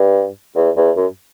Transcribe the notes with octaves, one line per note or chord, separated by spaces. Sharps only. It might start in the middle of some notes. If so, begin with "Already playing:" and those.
Already playing: G2
E2
E2
F#2